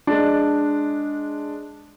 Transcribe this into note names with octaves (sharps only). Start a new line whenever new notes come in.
G#3 D4